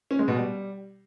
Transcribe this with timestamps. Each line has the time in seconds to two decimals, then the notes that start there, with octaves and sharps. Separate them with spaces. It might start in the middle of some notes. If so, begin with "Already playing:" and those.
0.11 C#4
0.19 G#3
0.28 B2
0.36 G3